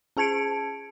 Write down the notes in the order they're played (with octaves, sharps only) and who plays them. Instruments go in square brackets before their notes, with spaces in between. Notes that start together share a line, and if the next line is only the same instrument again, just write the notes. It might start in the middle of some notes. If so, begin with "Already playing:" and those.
[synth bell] C#4 G#4 A5 G#6 C#7 D7